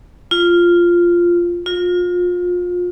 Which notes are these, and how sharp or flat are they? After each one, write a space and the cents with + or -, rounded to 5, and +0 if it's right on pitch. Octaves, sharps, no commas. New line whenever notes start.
F4 -5
F4 +30